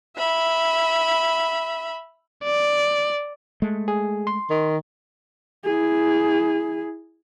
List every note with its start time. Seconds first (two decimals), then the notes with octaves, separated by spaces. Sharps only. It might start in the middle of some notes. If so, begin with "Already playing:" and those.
0.17 E5 B5
2.45 D5
3.62 G#3 A3
3.88 G#4
4.27 C6
4.50 D#3
5.65 E4 G#4